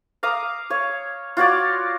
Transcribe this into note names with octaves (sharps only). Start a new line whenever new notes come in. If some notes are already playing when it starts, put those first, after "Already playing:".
F5 A#5 D6 D#6
C#5 F5
F4 F#4 C#5 D5